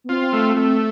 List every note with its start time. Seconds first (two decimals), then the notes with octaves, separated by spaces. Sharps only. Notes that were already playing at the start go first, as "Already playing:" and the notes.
0.04 B3
0.09 C4 F4
0.33 A3
0.57 A3